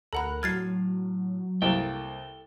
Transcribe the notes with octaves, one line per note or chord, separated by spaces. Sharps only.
D2 A4 A#4 F#5 A#5 B5 F#6
A2 F#3 F6 G#6 A6 C7
C2 A#3 A4 G5